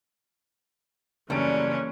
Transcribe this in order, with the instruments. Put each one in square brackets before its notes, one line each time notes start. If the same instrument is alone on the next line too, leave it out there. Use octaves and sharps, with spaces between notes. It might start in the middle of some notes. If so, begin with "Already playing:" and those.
[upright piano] F#1 D7 [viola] E3 C#4 [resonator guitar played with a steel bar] F#3 G3 A3